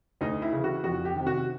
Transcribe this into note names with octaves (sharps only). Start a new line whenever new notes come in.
D2 D#4
E4
C#3 E3
F#4
F2 F#4
G4
C3 D#3
F#4